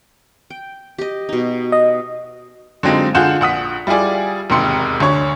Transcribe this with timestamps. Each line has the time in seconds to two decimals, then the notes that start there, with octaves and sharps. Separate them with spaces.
0.50 G5
0.98 G4 D#5
1.29 B2 D#4
1.72 D#5
2.83 D3 F#3 G#3 C4 D#4 F4
3.15 D3 F4 G#4 F#5 G6 E7
3.41 A#1 F#5 D#6 B6
3.87 G3 E4 F4 G#4 D5
4.50 E1 D#2 G#2 C3 C6 C#7
5.00 D2 D3 C#5 C#6